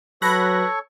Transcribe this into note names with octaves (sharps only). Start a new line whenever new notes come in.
F#3 A4 B4 C#5 B5 C#6 F#6 A#6